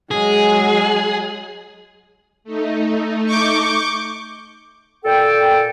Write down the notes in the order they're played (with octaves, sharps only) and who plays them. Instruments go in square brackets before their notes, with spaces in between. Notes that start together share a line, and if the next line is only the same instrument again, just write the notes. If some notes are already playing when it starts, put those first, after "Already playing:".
[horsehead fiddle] F#3 G#3 [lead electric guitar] G#4
[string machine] A3 D#4
[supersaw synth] C#6 D6 G6
[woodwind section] A#2 A4 G5